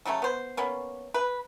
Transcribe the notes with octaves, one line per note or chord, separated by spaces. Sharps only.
C#3 F#3 A3 C#4
B3 C5
A#3 B3 C#4
B4